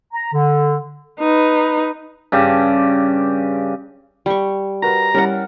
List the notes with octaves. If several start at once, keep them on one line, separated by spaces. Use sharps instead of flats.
A#5
D3
D#4 B4
G2 C#3 G4
G3 C#6
F#4 A#4 B4 A#5
G3 C#4 E4 A#4 F#5